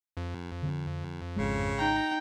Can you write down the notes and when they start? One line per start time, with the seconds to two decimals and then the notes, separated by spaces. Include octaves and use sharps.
0.17 F2
0.63 D3 C4
1.36 G#1 E2 C#3 G#3
1.79 D#4 G5 A#5